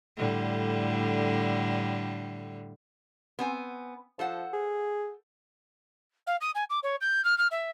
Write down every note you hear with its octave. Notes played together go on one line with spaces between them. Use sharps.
A2 D3 G3
B3 C4 G#5
F3 A4 C5 F#5
G#4
F5
D#6
G#5
D6
C#5
G6
F6
F6
E5